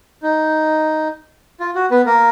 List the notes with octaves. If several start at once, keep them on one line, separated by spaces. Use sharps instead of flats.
D#4
F4
F#4
B3 B4
A#3 A#4